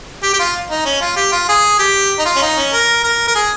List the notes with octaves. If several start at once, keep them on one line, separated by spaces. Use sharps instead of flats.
G4
G4
F4
D#4
C#4
F4
G4
F4
G#4
G4
D#4
F4
C#4
D#4
C#4
A#4
A#4
A#4
G#4